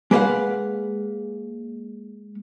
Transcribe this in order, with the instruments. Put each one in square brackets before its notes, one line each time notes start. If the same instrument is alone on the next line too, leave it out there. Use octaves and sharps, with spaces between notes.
[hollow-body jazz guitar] G#3 A#3 B4 C5 F5 F#5